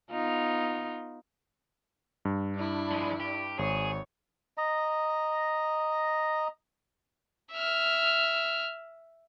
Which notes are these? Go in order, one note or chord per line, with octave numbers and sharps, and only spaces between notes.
B3 D#4 F4
G2
D4 E4
F3 G#3
G4
G#1 G#4 C#5
D#5 A#5
E5 F6